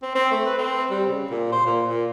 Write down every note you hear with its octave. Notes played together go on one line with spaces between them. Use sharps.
C4
C4
A3
B4
C4
G3
C#3
A#2
C5
A#2
A#2